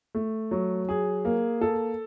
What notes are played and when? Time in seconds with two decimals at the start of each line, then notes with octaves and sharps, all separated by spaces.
0.15 A3
0.51 F#3
0.89 G#4
1.25 A#3
1.61 A4